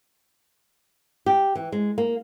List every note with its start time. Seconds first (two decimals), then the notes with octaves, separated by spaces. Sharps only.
1.26 G4
1.55 E3
1.72 G#3
1.98 A#3